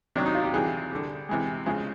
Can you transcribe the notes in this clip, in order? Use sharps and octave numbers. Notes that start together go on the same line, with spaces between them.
C3 D#3 F#3 D4
D#4
F4
G4
C3 E3 G3 G#4
D3 G3
C3 E3 G#3
C#3 F3 G#3